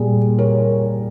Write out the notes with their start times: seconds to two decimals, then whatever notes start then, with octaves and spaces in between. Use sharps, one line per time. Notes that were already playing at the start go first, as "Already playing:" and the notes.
Already playing: A#2 G3 G#4
0.38 A#4 C#5